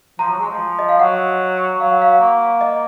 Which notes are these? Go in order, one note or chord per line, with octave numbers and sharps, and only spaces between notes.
F3 A#5
F#3
G#3
F3
D#5
F5
F#3 F#5
F#3 F5
F#5
F5
A#3
D#5